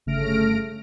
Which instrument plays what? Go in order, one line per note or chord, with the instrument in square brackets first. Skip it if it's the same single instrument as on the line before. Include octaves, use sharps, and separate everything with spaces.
[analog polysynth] G1 C#3 A3 F6 A#6 D7